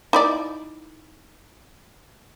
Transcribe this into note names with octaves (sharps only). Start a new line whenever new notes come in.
D#4 E4 D5